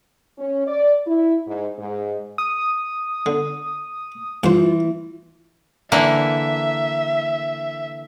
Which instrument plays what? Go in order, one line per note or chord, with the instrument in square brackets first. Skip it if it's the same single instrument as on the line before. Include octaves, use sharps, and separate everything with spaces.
[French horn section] C#4
D5
E4
G#2
G#2
[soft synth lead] D#6
[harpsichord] D3
[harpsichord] G2 C5 [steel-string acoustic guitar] E3 [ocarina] F4
[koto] D3 E3 A#3 [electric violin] E5